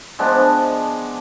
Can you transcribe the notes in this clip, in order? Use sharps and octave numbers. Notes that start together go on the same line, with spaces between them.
F3 G#3 B3 D4